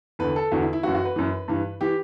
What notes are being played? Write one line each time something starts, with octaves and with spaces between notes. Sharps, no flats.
E2 D3 B4
A4
E2 D3 F#4
E4
E4
F#2 E3 F#4
F#4
B4
F#2 E3
G2 E3
E3 G4